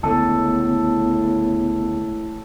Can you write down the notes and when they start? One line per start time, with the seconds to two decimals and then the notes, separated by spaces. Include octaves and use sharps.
0.03 C#2 A2 D3 B3 A4